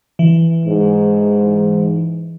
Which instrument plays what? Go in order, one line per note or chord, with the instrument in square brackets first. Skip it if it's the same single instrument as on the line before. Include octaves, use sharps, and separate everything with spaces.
[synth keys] E3
[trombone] G#2